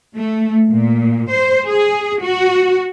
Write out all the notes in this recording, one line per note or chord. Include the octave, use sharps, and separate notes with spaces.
A3
A#2
C5
G#4
F#4